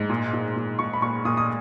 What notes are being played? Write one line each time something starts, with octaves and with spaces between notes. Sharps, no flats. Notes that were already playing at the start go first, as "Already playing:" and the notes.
Already playing: G#2
A#2
A#2
A#2
A#2 C#6
B5
A#2 C#6
A#2 D#6
D#6